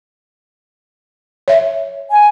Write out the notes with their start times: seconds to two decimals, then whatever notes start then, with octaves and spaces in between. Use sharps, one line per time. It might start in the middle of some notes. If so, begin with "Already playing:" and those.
1.48 C#5 E5
2.12 G#5